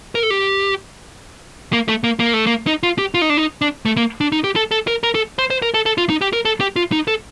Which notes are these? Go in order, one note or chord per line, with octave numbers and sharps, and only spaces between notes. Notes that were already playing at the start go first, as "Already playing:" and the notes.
A#4
A4
G4
A#3
A3
A#3
A#3
A3
A#3
D#4
F4
G4
F4
D#4
D4
D#4
D4
A3
A#3
D4
D#4
G4
A4
A4
A#4
A#4
A4
C5
C5
A#4
A4
A4
F4
D#4
G4
A#4
A4
G4
F4
D#4
A4